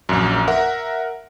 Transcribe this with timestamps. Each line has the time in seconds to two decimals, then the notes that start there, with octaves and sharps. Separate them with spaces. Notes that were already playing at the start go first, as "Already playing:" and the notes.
0.09 A#1 F#2
0.48 A#4 E5 F#5